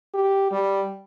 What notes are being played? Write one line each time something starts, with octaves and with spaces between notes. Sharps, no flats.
G4
G3